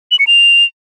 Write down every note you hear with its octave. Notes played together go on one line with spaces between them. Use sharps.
F#7
C#7
F7